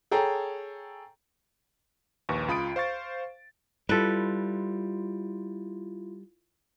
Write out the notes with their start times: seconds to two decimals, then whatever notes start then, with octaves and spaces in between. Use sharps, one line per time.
0.11 G#4 A4 C#5 G5 A#5
2.29 A#1 D#2 B4 C#6
2.48 C#2 F4 B5 D#6 A6 D7
2.76 C5 F5 C#6 A6
3.89 G3 E4 F4 A4 B4